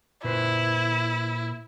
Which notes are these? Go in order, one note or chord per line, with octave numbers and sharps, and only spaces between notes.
A#2 E4 B4 C5